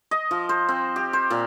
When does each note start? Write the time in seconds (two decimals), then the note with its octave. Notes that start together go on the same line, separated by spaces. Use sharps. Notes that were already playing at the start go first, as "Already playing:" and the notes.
0.11 D#5
0.31 F3
0.49 C5
0.69 C4
0.96 G4
1.13 C5
1.30 A#2